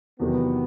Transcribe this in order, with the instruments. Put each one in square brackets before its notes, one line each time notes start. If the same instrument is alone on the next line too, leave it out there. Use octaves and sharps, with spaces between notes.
[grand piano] E2 C3 D#3 F#3 [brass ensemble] B3